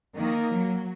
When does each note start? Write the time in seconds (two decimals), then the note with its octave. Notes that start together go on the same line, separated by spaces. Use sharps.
0.16 D#3 A#3
0.51 F#3